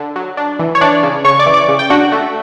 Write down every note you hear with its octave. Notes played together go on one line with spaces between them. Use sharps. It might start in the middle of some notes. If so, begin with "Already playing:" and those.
Already playing: D3 D4
F#3
D4
E3
C#5
E3 D4 D5
C#3
C#3 C#5 C#6
D5 D6
E3
D5 D6
C#3
G5
D4 F#4 F#5
A3